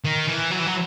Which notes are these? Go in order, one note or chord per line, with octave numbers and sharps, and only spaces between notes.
D#3
E3
F#3
E3
F#3